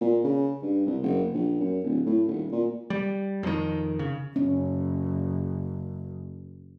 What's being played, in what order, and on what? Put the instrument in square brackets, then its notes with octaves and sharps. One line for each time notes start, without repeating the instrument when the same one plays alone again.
[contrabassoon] A#2
C#3
G2
C2
F#1
A#1
F#2
D1
A2
D#1
A#2
[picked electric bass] G3
F2 D#3
C#3
[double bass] F#1 [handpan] C#4